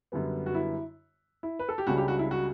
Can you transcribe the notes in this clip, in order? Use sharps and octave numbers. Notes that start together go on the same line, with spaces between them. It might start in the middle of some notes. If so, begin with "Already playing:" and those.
F#2 D3 G3 B3
F#4
E4
E4
B4
A4
G4
C#2 C#3 G3 D4 F#4
G4
F#4
E4
F#4